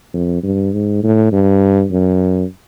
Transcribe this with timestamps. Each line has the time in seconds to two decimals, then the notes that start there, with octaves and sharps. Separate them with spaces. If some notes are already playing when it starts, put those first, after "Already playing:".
0.14 F2
0.43 G2
0.73 G#2
1.03 A2
1.32 G2
1.91 F#2